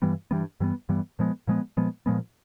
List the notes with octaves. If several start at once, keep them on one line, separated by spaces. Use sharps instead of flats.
G2 E3 G3 B3
G2 E3 G3 B3
G2 E3 G3 B3
G2 E3 G3 B3
A#2 F3 G#3 B3
A#2 F3 G#3 B3
A#2 F3 G#3 B3
A#2 F3 G#3 B3